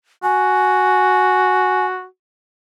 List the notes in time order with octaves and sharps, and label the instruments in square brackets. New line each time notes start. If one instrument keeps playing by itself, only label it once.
[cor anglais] F#4 [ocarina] G#5